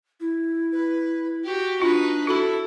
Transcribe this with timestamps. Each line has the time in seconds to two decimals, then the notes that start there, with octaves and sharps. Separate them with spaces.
0.20 E4
0.72 B4
1.45 F#4 G4
1.82 D4 D#4 F4 B4
2.27 E4 F#4 A4 B5